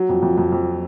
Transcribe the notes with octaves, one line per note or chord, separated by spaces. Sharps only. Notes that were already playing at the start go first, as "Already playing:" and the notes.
Already playing: F#3
F2
F2
F2
F2